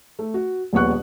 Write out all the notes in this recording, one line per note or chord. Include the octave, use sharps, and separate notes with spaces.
A3
F#4
D#1 A#1 B3 F#5 C#6 F#6